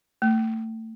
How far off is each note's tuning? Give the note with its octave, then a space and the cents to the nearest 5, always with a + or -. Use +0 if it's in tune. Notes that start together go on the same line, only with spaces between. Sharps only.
A3 +25